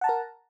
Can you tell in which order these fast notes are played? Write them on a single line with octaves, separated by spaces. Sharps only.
F#5 A5 A#5 A#4